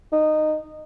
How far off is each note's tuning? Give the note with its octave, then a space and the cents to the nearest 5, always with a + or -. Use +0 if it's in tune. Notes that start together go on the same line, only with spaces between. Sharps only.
D#4 -15